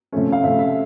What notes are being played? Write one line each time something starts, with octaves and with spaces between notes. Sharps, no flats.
C3 F3 A3 C#4
F5
C3 F3 A3 C#4 E5
E5